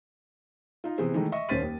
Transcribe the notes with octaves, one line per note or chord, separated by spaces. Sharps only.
D#4 F4
C3 E3 B3 G#4 C5
D#3 E3 G#3 A3 D#4
D#5 E5 C#6
D#1 C#4 C5 A6 B6 D#7
D#2